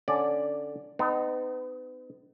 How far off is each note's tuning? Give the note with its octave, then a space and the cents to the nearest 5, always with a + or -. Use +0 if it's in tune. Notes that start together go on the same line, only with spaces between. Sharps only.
D3 +0 C#4 +0 D5 +0
B3 +40 D#4 -15